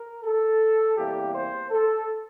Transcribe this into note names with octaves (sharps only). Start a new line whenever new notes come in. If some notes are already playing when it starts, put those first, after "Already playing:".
Already playing: A#4
A4
E2 C3 G3 A#3 G4
C5
A4